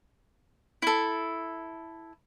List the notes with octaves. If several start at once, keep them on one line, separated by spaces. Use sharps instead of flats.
E4 A4